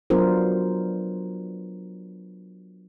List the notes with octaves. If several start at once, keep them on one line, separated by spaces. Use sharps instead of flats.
F#3 B3 D4 F4 A#4 C5